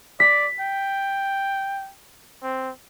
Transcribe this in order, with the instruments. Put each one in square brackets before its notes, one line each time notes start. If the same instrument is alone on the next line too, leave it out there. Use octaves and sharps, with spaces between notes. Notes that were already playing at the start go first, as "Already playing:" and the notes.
[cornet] D5 [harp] B6
[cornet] G5
C4